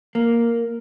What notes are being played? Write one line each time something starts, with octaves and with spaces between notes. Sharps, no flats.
A#3